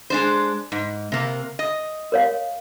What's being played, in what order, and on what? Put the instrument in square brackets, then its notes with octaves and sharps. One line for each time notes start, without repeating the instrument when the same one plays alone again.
[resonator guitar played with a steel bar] G#3 D4 C5
G#2
C3 A#3
D#5
[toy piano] A#4 C#5 F5